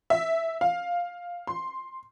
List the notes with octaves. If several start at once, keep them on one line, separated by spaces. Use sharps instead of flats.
E5
F5
C6